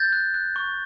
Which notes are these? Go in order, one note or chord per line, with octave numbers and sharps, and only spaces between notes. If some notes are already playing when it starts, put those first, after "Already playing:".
Already playing: G6 A6
F#6
F#6
C#6